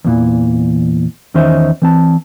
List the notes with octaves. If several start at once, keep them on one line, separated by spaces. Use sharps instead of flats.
E2 A#2 E3
E2 D#3 C#4 D#4 C5 E5
E3 C4 A5